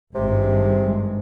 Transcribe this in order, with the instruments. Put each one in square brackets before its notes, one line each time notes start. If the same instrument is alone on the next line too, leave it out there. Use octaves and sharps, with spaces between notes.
[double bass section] G#1 G2 G#3 [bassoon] C3